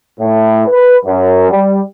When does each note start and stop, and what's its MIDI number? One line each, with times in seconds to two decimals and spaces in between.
0.20 0.64 45
0.66 0.96 71
1.05 1.49 42
1.51 1.79 55